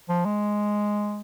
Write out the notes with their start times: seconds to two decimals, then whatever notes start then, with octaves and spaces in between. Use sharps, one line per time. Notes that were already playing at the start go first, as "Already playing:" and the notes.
0.09 F3
0.25 G#3